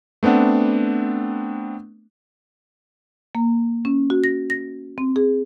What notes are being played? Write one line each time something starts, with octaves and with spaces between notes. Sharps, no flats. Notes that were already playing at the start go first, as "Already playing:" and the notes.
A3 B3 C4 D4 F#5
A#3
C#4
F#4
A#6
A#6
C4
G#4